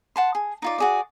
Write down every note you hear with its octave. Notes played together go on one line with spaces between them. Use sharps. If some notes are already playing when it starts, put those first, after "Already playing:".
F#5 A5 C6
G#4
D#4 F4 D5
F#4 G#4 D5